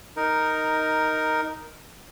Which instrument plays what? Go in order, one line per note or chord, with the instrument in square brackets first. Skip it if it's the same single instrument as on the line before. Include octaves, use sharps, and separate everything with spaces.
[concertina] D#4 A#4